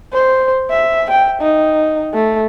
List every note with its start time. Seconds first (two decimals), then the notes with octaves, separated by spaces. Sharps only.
0.13 C5
0.70 E5
1.11 G5
1.42 D#4
2.14 A3